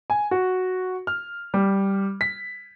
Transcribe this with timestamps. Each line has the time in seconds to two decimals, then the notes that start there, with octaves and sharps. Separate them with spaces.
0.10 G#5
0.31 F#4
1.07 F6
1.54 G3
2.21 B6